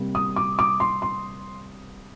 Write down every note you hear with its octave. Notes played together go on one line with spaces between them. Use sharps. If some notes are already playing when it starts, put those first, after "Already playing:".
Already playing: C3 G3 A#3
D#6
D6
D6
C6
C6